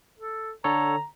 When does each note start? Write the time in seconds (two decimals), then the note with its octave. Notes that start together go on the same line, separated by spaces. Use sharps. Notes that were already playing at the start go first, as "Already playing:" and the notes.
0.19 A4
0.64 D3 A4 C#5 A#5